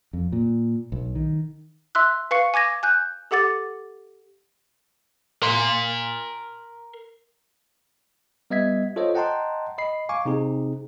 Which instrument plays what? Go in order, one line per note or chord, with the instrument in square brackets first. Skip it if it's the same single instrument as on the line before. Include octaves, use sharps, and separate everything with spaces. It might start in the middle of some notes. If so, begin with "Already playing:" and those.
[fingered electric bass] F2
A#2
B1
D#3
[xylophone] E5 C6 E6 F#6
B4 F5 C#6 C#7
G#5 D6 G#6 A#6
G#5 F#6 G6
G4 A4 F#5 D6 A6
[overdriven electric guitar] A#4 C6
[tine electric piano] G3 B3 D#5 E5 G#6 B6
F4 A4 C5 C#5 D#5
D#5 F#5 G5 A5 A#5 C6
D#5 B5 C7
F5 G#5 C#6 D6
C3 C4 D#4 G#4